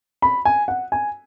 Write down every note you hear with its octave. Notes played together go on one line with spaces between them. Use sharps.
B5
G#5
F#5
G#5